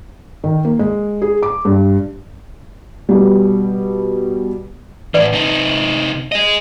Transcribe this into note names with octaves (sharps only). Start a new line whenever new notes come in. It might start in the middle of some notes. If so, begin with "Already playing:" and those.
D#3
A#3
G#3
G#4
D6
G2
B2 G3
A2 E3 B4 D5 F#5
C3 D#4
G#4 D#5